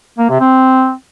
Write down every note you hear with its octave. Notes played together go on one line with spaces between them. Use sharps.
A#3
C3
C4